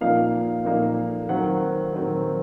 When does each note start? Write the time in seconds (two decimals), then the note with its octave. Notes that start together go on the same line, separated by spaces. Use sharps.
0.01 A#2 F3 A#3 D#4 F5
0.65 A#2 F3 A#3 D#4
1.29 D#3 F#3 C4 F#5
1.93 D#3 F#3 C4